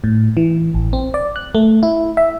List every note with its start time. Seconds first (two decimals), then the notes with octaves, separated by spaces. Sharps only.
0.04 A2
0.37 E3
0.74 A1
0.93 C4
1.14 D5
1.36 F#6
1.55 A3
1.83 E4
2.17 E5